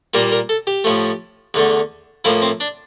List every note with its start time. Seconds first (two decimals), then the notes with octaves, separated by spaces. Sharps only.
0.14 A#2 G3 A#3 A#4
0.32 A#4
0.49 A4
0.67 G4
0.84 A2 F3 A3
1.54 E2 D3 A3
2.25 A2 F3 A#3 E4
2.42 C4
2.60 D4